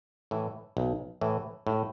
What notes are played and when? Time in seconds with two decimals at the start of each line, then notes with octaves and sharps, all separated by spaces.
0.31 A2 E3
0.77 B1
1.21 A2 E3
1.67 A2